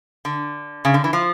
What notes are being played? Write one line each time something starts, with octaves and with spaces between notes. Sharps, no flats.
D3
C#3
D3
E3
F3